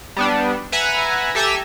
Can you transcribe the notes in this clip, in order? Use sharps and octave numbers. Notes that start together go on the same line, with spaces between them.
G3 B3 D4
B4 E5 F#5 G#5 A#5
G4 A4 E5 G#5 A#5 E6